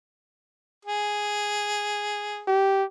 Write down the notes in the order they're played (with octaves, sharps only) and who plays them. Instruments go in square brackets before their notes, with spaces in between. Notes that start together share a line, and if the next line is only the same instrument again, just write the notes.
[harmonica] G#4
[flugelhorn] G4